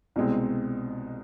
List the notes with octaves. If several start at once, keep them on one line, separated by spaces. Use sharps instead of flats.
C2 B2 G#3 C4